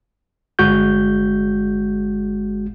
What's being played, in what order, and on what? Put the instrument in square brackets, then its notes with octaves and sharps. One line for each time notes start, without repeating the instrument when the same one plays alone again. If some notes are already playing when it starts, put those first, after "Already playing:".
[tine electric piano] G1 G#3 F#4 G6